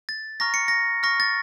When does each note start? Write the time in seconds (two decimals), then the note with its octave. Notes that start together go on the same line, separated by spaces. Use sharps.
0.09 A6
0.40 A#5 C#6 F6 A#6
0.54 C#7
0.68 A#6
1.03 C#6 F6 A#6
1.20 A6